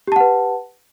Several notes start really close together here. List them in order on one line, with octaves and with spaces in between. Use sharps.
G4 A5 F#5 B4